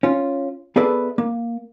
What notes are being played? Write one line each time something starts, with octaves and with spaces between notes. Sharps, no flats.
C#4 F4
B3 G#4 A4 B4 D5 E5
A#3